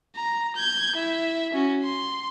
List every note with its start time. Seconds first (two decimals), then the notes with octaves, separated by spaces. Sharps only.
0.16 A#5
0.56 G6 G#6
0.96 E4 E5
1.53 C#4 F#4
1.83 C6